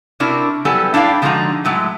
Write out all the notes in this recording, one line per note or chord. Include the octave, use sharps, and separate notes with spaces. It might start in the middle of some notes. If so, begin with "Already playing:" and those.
C3 D4 E4 F#4 A#4
F#3 G3 B3 E4 A4 G#5
D4 E4 D5 F5 G5
D3 F3 G#3 D#4 F#4 A#5
A2 F#3 G#3 E4